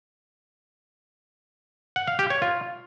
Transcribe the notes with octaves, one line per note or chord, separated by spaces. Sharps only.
F#5
F5
G4
C#5
F4